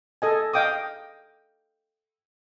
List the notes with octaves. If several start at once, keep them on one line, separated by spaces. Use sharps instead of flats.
A4 D#5 G#5
D#5 F5 G5 D6 D#6